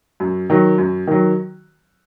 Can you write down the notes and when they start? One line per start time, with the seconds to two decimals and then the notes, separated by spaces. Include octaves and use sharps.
0.20 F#2
0.50 D#3 F#3
0.78 F#2
1.07 D#3 F#3